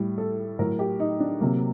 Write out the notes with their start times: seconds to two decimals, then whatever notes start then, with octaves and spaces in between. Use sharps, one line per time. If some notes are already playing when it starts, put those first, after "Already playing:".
Already playing: A2 G3
0.18 A4
0.59 A2 F#3 A#4
0.79 G4
1.00 D#4
1.20 D4
1.40 C3 F#3 A#3